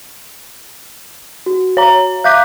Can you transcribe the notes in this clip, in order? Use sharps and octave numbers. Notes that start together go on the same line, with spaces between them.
F#4
C#5 A#5
E5 F5 D6 F#6 G6 B6